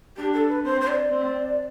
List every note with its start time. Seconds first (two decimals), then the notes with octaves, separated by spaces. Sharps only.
0.17 D4 G4
0.33 A4
0.49 B4
0.64 C4 C5
0.81 C5
0.88 D5
1.11 C4